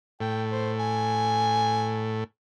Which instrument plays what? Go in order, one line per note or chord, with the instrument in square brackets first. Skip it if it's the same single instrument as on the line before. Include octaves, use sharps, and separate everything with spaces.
[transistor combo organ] A2 [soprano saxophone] G5
[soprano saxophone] C5
G#5